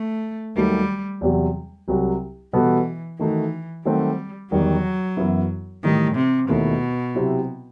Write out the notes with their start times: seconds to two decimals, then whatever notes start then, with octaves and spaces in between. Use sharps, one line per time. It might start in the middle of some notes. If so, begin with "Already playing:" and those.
Already playing: A3
0.56 D#2 D#3 F#3 G3 A3
1.21 E2 C3 F#3
1.88 C2 C3 F#3
2.53 B2 E3 G3 B3 F#4 A4
3.19 D#3 E3 A3 D#4 F#4
3.85 D#3 F#3 G3 A3 C4 F#4
4.51 E2 D#3 F#3 G3
5.17 F#2 E3 B3 E4
5.84 A2 D#3 E3 G3
6.16 C3
6.49 D#2 B2 D#3 A3 E4
7.15 C3 F#3 C4 E4